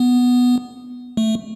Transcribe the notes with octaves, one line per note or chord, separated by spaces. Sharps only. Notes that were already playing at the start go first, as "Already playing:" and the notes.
Already playing: B3
A3